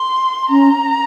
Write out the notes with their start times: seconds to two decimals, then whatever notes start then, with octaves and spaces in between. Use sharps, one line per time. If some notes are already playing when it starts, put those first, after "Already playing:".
Already playing: C6
0.50 C#4 A#5